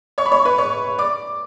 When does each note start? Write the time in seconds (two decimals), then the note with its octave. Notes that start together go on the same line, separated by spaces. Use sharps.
0.18 C#5 C#6
0.26 B5
0.31 C#5 C#6
0.45 B4 B5
0.58 C#5 C#6
0.98 D5 D6